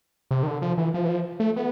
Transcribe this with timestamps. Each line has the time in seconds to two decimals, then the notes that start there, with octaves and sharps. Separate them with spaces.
0.31 C3
0.43 D#3
0.47 D3
0.62 F3
0.78 E3
0.94 F3
1.05 E3
1.09 F3
1.40 A3
1.56 B3